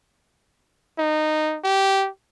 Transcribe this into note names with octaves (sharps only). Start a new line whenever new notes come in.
D#4
G4